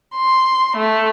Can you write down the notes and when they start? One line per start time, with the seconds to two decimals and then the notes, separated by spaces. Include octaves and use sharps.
0.15 C6
0.78 A3